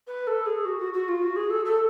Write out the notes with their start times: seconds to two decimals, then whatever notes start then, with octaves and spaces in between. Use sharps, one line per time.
0.07 B4
0.27 A4
0.46 G#4
0.65 F#4
0.79 F#4
0.93 F#4
1.08 F4
1.22 F#4
1.36 G#4
1.50 A4
1.65 A4